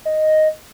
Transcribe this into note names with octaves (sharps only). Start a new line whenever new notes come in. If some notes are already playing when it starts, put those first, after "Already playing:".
D#5